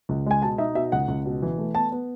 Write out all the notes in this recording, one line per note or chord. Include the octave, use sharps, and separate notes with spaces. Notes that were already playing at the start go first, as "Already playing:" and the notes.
C#2
G#3 G#5
B2 A5
D#4 E5
B2 E5
C#2 F#5
C#2
B2
E3
A3
B3 A5
B3